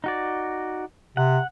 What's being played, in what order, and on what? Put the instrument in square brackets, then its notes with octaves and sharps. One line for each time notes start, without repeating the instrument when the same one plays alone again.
[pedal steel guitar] D#4 F#4 D5
[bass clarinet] C3 [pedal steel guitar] F#5